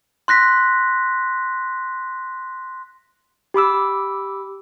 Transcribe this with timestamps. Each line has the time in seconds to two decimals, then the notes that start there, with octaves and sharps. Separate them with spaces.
0.28 C6 F#6 A#6 B6
3.54 G4 B5 D6 E6